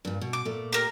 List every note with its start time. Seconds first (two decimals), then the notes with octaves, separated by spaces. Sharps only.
0.05 G2 A#2
0.21 B2
0.33 D6
0.45 A#2 A3
0.73 G4 A#4